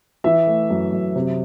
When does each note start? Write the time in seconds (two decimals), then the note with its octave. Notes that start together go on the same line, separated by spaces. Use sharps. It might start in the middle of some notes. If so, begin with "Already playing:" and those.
0.24 E3 E5
0.47 A3
0.70 F#2
0.92 F#2
1.16 C3